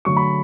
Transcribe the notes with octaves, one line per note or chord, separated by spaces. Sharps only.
D3 F#3 A3 C#6
B5